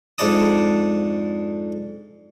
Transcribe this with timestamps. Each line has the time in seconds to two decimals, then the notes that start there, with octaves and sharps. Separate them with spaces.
0.18 F2 G#2 D4 D5 A5 D#6